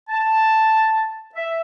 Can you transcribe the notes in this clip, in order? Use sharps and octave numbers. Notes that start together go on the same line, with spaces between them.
A5
E5